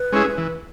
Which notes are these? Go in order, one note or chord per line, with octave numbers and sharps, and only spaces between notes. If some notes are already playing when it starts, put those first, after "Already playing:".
Already playing: B4
G#3 C#4 E4 G#4
E3